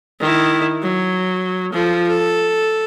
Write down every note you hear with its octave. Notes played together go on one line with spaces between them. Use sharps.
D#3 E4
F#3
F3 A4
A4